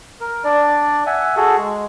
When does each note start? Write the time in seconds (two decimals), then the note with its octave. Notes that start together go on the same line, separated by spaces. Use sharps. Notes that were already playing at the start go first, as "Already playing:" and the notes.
0.20 A#4
0.44 D4 D5
1.06 E5 F#5 G#5
1.36 F#4 G#4 A4
1.58 G#3